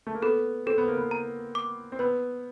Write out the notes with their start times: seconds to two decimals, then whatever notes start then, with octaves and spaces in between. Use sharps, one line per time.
0.07 A3
0.15 A#3
0.22 B3 A4
0.66 C4 A4
0.78 B3
0.88 A#3
0.98 B3
1.11 A#5
1.55 D6
1.92 C4
1.99 B3 B4